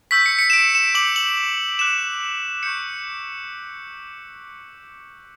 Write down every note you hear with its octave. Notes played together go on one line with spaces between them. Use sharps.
C#6 E6 G6 B6
C#7
C#7
E7
D7
E7
D6 G6 F#7
F#7
D6 F#6 E7
C#6 G6 C#7